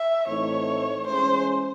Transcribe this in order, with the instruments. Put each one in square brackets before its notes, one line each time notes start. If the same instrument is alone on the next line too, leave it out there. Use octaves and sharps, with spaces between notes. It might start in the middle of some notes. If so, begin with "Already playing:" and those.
Already playing: [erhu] E5
[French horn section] A2 E3 A3 C4 D#4 [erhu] C#5
[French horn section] E3 G#3 C#4 G#4 [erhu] C5